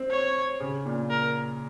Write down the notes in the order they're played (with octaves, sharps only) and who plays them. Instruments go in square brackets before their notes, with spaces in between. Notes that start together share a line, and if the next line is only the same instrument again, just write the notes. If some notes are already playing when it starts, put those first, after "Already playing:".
Already playing: [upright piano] C4
[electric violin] C#5
[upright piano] C#3
A#2
[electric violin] A#4